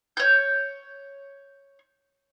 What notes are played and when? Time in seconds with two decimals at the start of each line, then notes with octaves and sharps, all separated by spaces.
0.17 C#5 G6